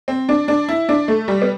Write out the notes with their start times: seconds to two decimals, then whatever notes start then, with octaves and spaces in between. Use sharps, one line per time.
0.08 C4
0.29 D4
0.48 D4
0.69 E4
0.89 D4
1.08 A3
1.28 G3
1.42 B3